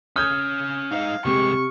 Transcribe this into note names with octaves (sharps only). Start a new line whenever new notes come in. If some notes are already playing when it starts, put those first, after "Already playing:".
C#3 C#4 D#6 F6 G6 G#6
G#3 D#4 F5
C2 C3 G#3 G4 C#6